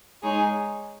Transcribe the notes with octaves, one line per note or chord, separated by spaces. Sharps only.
G#3 D#4 G#4 C#5